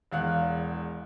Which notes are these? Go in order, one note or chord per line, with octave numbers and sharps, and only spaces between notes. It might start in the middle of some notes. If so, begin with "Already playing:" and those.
E1 E2 F5 F#5 F#6